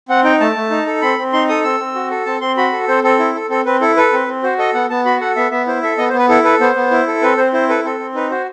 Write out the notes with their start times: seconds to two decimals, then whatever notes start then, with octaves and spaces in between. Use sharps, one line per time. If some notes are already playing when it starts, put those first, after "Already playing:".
0.09 C4 F#5
0.24 D#4 G5
0.40 A3 A5
0.56 A3
0.71 D#4
0.86 A4
1.02 C4 B5
1.18 C4
1.33 D#4 C6
1.49 A4 D#6
1.64 C4 E6
1.80 C4
1.95 F#4
2.11 A4
2.26 C4 A5
2.41 C4 C6
2.57 F#4 B5
2.72 A4
2.88 C4 C5
3.03 C4 A4
3.19 E4
3.35 A4
3.50 C4 A4
3.66 C4 B4
3.81 E4 A4
3.96 A4 B4
4.13 C4
4.28 C4
4.43 F#4 C5
4.58 A4 D#5
4.74 B3 F#5
4.90 B3 A5
5.05 F#4 B5
5.20 A4 F#5
5.36 B3 E5
5.51 B3 E5
5.67 E4 C5
5.82 A4 E5
5.98 B3 D#5
6.09 C5
6.13 B3
6.19 B4
6.29 E4 A4
6.44 A4 B4
6.60 B3 C5
6.75 B3
6.91 E4
7.07 A4
7.22 C4 B4
7.37 C4 C5
7.53 E4 C5
7.69 A4 B4
7.85 C4 A4
7.99 C4
8.15 D#4 B4
8.31 F#4 C5